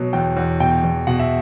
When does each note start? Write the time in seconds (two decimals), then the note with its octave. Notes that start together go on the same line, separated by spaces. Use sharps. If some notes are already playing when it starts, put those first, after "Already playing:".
Already playing: B2 F#3
0.13 E2 G5
0.37 E2
0.60 B2 G5
0.84 E2
1.07 B2 F#5
1.19 E5